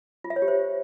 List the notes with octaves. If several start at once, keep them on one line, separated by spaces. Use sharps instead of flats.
F4
E5
C#5
G4
C5